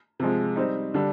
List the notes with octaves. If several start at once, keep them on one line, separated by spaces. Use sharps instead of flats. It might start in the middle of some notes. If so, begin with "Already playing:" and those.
C3 F3 G#3
G3 C4 D#4
D3 G3 D4